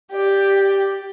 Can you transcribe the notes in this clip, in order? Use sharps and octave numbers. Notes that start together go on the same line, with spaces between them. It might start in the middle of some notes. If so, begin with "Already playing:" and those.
G4 D5